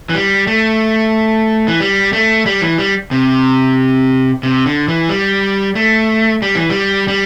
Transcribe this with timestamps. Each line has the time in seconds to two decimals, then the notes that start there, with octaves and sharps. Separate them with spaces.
0.09 E3
0.14 G3
0.47 A3
1.68 E3
1.80 G3
2.13 A3
2.46 G3
2.61 E3
2.78 G3
3.11 C3
4.43 C3
4.66 D3
4.88 E3
5.09 G3
5.75 A3
6.42 G3
6.56 E3
6.70 G3
7.08 G3